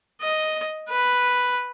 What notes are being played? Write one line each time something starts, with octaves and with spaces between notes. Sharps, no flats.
D#5
B4